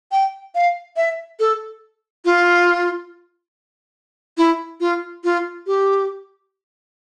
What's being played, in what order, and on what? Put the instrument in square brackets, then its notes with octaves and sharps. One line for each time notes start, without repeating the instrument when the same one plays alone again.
[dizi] G5
F5
E5
A4
F4
E4
F4
F4
G4